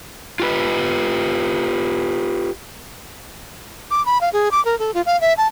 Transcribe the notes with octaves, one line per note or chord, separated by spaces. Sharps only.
F4 G4 B4
D6
B5
F5
G#4
D6
A#4
A4
F4
F5
E5
A5